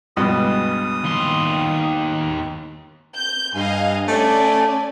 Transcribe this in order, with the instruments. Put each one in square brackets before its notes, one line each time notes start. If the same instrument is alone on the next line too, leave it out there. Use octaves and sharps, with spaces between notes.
[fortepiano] C#2 G2 B2 [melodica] D#6
[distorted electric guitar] D#2 C6
[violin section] G6
[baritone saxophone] G2 [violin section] D#5 F5 G#5
[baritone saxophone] A3 [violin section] C#4 D5 G#5